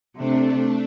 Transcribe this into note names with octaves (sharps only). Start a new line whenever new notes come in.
C3 A3 D4